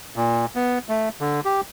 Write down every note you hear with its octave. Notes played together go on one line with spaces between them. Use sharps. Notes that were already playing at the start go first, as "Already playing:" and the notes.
A#2
B3
A3
D3
G4